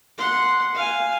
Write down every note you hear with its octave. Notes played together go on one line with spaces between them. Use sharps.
F#5 C6
F5 G#5